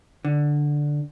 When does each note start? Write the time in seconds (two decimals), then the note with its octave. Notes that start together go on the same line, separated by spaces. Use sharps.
0.25 D3